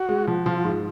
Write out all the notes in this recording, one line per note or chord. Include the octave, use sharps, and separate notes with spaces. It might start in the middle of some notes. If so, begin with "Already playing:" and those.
Already playing: F#4
G#3
F3
F3 F4
G#2